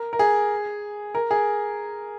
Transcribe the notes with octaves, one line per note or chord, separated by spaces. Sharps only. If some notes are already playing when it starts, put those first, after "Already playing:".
Already playing: A#4
A#4
G#4
A#4
G#4